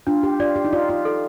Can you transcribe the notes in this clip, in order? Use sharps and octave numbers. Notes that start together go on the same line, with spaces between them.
D4 F4
G4
F4 D5
G4
D#4
F4 D5
F4
A4